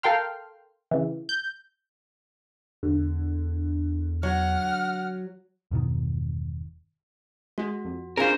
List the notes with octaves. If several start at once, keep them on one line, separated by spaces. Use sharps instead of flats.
A4 A#4 F5 G5 C6 F6
C#3 E3
G6
E2 D3
F#3 F#5 F6
E1 G2 B2 D#3
G#3 F#4
F2
C#4 D4 F4 G#4 A#4 C5